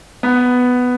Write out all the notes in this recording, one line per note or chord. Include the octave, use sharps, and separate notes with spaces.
B3